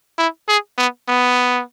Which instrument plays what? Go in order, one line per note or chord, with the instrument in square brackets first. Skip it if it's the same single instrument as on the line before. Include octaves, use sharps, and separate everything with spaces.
[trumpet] E4
G#4
B3
B3